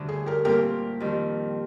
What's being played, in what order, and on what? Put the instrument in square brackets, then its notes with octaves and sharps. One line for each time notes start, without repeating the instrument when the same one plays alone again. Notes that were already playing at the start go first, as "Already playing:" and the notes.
Already playing: [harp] D2 D3 G3 D4
[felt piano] G#4
G4 A#4
[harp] A#2 G3 C4 F4 [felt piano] G4 A#4
[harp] F2 D#3 G3